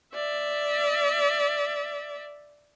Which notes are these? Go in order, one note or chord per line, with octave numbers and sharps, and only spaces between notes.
D5 E5